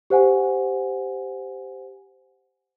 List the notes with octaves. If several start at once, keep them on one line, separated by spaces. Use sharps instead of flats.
G4 C5 F#5 G#5